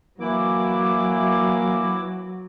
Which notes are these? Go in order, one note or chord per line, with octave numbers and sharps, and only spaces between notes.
E3 F#3 A#3 E4 D6